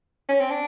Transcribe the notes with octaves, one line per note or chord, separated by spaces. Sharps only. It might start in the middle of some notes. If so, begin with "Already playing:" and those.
C#4
C4
D4